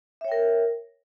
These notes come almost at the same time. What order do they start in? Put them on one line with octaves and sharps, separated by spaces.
E5 C#5 G5 A#4